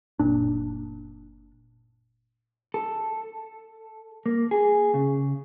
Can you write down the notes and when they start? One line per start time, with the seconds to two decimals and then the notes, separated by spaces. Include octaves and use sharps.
0.19 F#1 A#2 D4
2.74 A4
4.26 A#3
4.51 G#4
4.94 C#3